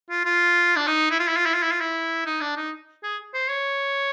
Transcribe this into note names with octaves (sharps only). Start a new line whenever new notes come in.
F4
F4
D4
D#4
E4
F4
E4
F4
E4
F4
E4
F4
E4
D#4
D4
D#4
G#4
C5
C#5